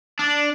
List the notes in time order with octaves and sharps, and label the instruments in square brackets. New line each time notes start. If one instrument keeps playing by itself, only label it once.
[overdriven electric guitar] D4